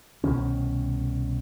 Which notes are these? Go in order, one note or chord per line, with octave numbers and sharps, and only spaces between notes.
C2 B2 D#3 C#4